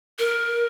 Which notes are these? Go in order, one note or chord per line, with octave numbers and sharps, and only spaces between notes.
A#4